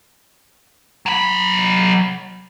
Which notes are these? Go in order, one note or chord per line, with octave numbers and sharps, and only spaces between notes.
F#3 B5